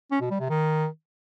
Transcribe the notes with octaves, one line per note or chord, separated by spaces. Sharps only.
C#4
B2
G3
C3
D#3